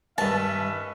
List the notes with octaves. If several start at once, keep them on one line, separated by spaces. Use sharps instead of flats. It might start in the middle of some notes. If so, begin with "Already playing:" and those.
G2 D#3 C#4 B4 E5 A5